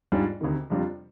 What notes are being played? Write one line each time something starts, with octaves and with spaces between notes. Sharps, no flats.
G#2 G3 D4 F4
D2 C3 D#3
F2 C3 G3 D4 F4